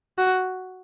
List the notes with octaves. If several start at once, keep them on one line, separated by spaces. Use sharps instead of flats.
F#4